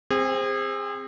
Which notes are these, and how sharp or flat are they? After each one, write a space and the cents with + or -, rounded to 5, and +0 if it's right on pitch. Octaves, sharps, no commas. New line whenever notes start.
C4 +5 G#4 -30